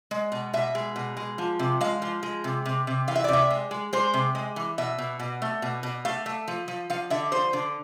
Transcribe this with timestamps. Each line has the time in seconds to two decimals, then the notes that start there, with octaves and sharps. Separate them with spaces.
0.11 G#3
0.32 B2
0.53 B2 E5
0.75 G#3
0.96 B2
1.17 G#3
1.38 F3
1.59 C3
1.81 G#3 F5
2.02 F3
2.23 G#3
2.44 C3
2.65 C3
2.87 C3
3.08 E3 F5
3.16 E5
3.24 D5
3.28 C3 E5
3.50 G#3
3.71 G#3
3.93 G#3 C5
4.14 C3
4.35 G#3
4.56 E3
4.78 B2 E5
4.98 B2
5.20 B2
5.42 A3
5.62 B2
5.83 B2
6.05 A3 F5
6.26 A3
6.48 F3
6.68 F3
6.90 F3 F5
7.10 D3 E5
7.32 F3 C5
7.53 D3